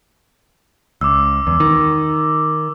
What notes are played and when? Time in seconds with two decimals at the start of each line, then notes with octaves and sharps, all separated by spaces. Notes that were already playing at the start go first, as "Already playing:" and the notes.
1.01 C#2 D6 E6
1.47 E2
1.60 D#3